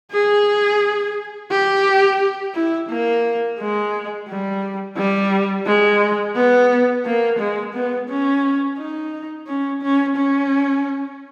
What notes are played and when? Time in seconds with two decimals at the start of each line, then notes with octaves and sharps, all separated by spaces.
0.12 G#4
1.51 G4
2.54 E4
2.90 A#3
3.59 G#3
4.28 G3
4.97 G3
5.66 G#3
6.35 B3
7.05 A#3
7.39 G#3
7.74 B3
8.09 C#4
8.78 D#4
9.47 C#4
9.82 C#4
10.16 C#4